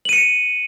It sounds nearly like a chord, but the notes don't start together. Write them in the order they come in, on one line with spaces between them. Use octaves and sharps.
F#7 D#7 C#7